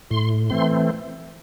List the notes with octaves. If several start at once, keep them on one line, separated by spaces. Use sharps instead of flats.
A2 C6
E3 A3 C4 C6